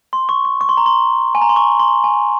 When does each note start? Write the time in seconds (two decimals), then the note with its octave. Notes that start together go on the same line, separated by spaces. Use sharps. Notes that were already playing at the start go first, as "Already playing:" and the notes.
0.13 C6
0.29 C#6
0.45 C#6
0.61 C#6
0.69 C6
0.77 A#5
0.86 C6
1.35 G#5
1.42 A#5
1.49 C6
1.56 C#6
1.79 C6
2.04 G#5